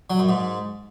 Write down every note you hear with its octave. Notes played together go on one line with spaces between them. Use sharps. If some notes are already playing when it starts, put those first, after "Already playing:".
F#3
F#2
G#2